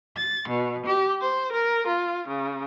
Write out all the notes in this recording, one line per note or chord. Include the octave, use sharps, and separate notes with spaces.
A6
B2
G4
C5
A#4
F4
C#3